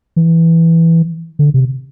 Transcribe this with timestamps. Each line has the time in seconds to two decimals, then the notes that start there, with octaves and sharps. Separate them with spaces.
0.16 E3
1.39 D3
1.54 C3